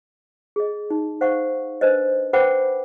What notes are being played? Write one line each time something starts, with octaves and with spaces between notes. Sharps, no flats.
G#4 D#5
D#4
C5 F5 F#5 C#6
D4 B4 C5 D#5
B4 C5 F#5 G5 B5 D6